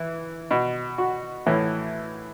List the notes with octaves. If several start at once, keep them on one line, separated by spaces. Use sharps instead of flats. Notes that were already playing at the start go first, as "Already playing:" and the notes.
Already playing: E3
B2
F#4
A2 E3